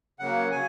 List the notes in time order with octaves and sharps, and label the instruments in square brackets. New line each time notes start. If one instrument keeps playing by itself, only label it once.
[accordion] C#3 F#3 A#3 F#5
C#3 F#3 G#5